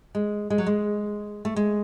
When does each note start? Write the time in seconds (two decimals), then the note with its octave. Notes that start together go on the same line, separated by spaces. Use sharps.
0.15 G#3
0.50 G#3
0.58 F#3
0.66 G#3
1.45 A3
1.56 G#3